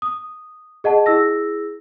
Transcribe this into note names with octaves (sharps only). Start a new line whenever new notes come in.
D#6
G#4 D#5 F#5 A5
E4 G#4 E6 A#6